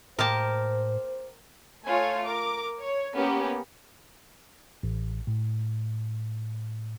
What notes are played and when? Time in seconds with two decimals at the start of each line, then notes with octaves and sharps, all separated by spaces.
0.19 A2 G#3 A#3 G4 A#4 C5 A5
1.84 A3 F4 C#5 G#5
2.23 A#4 D6
2.81 C#5
3.14 A#3 B3 C#4 G4
4.83 A1
5.27 A2